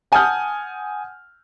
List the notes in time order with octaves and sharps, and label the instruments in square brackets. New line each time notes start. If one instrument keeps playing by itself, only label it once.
[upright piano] F#5 G#5 A5 D#6 F6 G6